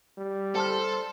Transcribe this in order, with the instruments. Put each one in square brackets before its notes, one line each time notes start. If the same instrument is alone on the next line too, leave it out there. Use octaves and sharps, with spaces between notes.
[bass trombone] G3
[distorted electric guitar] A4 [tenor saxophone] C5 [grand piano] A5 F6